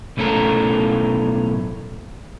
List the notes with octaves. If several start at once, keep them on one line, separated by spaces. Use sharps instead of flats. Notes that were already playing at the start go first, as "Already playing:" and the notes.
B1 A2 A3 C#4 A4 A#4